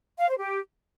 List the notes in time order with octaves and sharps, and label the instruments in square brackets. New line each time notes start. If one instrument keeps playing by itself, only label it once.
[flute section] F5
C5
G4